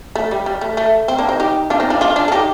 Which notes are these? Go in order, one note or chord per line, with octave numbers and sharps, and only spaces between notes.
A3
G3
G3
A3
A3
C4
A#3 D4
C4 D#4
D#4 G4
D4 F4
C4 D#4
D4 F4
D4 F4
D4 F4
A4
D#4 G4